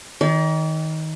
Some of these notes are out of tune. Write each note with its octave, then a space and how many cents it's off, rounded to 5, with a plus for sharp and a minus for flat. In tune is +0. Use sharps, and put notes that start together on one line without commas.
D#3 +20 D5 -40